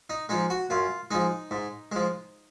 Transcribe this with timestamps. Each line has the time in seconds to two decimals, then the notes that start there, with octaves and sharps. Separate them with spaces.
0.10 D#4
0.29 F3 G#3 D#4
0.50 F#4
0.70 F#2 F4
1.11 F3 G#3 D#4
1.51 G#2
1.92 F3 G#3